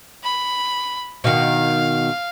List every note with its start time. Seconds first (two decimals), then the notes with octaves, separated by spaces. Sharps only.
0.23 B5
1.24 B2 D#3 F5